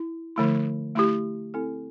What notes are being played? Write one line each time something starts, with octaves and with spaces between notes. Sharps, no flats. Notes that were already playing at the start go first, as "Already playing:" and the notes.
Already playing: E4
D3 F3 A3 E4
A3 E4 G4
C4 E4 A4